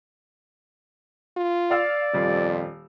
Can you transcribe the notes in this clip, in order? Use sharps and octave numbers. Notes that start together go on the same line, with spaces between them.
F4
D5 F5 E6
D#1 F2 G3 F4